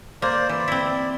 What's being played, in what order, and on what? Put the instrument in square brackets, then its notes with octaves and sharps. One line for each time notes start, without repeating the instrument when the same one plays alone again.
[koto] A#3 [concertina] C5 D5
[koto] E3 [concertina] D5
[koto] C4 E4